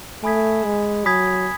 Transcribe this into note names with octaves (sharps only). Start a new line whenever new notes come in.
A3 G#5 B5 D#6 G#6 B6
G#3
F#3 G#5 B5 D#6 G#6 B6